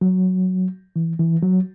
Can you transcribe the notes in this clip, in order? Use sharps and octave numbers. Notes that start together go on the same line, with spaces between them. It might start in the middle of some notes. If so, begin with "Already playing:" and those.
F#3
E3
E3
F#3